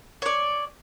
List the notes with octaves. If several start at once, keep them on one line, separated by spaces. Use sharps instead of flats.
C#5 D5